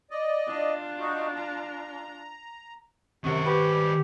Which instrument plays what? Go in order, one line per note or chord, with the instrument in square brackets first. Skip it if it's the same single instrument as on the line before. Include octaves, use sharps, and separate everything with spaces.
[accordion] D5 D#5
[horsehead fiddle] D4 F4
[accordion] D#4 F#4
A#5
[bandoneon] F#2 [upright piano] C3 [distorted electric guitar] D#3 C5 [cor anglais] F#4
[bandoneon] G4 [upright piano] B4
[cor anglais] G3